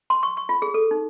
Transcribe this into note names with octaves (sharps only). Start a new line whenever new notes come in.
C6
C#6
C#6
F4
G#4
A4
D#4